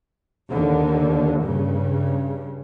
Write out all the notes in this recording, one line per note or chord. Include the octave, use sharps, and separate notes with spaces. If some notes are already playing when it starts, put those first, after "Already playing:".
D#2 D3
G2 C#3